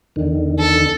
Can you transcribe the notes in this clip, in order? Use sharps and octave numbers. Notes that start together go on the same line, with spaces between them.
E2 D3 D#3
A4